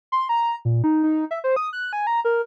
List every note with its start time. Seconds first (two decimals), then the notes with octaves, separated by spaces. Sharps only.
0.12 C6
0.29 A#5
0.65 A#2
0.84 D#4
1.03 D#4
1.31 E5
1.44 C5
1.56 D#6
1.73 F#6
1.93 G#5
2.07 A#5
2.25 A#4